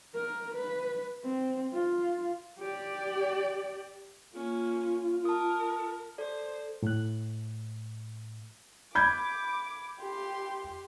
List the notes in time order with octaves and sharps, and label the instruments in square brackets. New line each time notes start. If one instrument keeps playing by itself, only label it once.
[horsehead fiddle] A#4
B4
C4
F4
G4 D5
[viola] A#3 C#4 [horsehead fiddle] F4
[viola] A#4 [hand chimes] A5 D#6
[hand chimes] A4 D5 [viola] C5
[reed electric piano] A2 F#6
[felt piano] B5 G6 G#6 [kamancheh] D6
[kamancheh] G4 C6